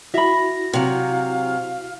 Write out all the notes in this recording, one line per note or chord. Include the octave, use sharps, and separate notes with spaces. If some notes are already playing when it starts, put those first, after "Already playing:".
E4 F#4 E5 B5 A#6
C3 F#3 F5